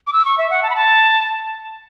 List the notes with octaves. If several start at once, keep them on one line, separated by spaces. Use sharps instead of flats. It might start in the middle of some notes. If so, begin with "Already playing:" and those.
D6
E6
C#6
E5
F#5
A5
B5
A5